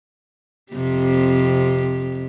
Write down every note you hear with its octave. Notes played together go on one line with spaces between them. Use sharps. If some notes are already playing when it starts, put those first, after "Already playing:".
F2 C3 G4